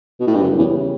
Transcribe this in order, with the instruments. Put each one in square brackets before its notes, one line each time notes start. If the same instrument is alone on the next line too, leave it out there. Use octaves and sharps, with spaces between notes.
[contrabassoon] B2
A2
G2
[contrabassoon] F#2 [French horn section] C#3 G3 C#4 E4
[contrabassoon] E2